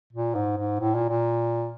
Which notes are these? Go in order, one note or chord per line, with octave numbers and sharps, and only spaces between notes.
A#2
G#2
G#2
A2
A#2
A#2